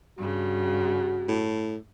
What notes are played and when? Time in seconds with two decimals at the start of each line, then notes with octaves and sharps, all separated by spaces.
0.18 G2 C#3 F#4
1.29 A2